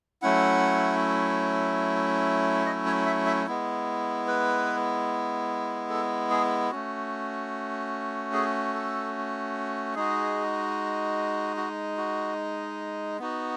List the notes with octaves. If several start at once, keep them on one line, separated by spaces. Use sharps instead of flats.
F#3 A3 C#4 E4 F#5
D#5
C#5
E5
E5
G#3 B3 E4
B4
A4
G#4
A3 C#4 F#4
G#4
A4
G#3 D#4 F#4 G#4
F#4
F#4
B3 D#4 F#4